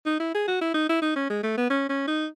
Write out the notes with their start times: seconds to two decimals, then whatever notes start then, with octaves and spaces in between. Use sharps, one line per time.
0.06 D#4
0.20 E4
0.34 G#4
0.48 F#4
0.62 E4
0.74 D#4
0.89 E4
1.02 D#4
1.16 C#4
1.30 G#3
1.43 A3
1.58 B3
1.70 C#4
1.89 C#4
2.08 D#4